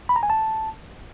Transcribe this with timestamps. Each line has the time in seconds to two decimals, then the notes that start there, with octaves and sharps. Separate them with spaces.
0.09 B5
0.16 A#5
0.23 G#5
0.30 A5